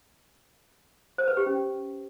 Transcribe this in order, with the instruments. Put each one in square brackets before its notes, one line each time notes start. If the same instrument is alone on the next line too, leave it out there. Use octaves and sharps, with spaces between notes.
[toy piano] C5
B4
G4
C#4